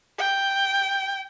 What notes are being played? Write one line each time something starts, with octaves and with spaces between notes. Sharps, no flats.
G5